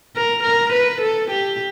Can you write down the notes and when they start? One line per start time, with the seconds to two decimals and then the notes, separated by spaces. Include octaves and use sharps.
0.16 A#4
0.44 A#4
0.73 B4
1.01 A4
1.31 G4